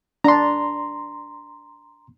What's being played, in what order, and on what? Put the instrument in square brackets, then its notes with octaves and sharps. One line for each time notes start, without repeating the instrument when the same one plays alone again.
[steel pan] D4 [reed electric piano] A#5 C6